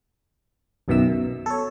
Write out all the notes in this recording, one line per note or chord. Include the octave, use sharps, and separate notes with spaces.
B1 F#2 B2 D#3 E5 E6
B2
A4 C#5